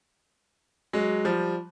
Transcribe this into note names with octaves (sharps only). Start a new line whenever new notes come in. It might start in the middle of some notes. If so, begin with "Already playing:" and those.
F#3 G#3
F3 G3